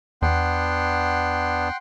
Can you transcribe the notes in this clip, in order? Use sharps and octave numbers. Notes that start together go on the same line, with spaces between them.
E2 B3 D4 F#5 G5 C6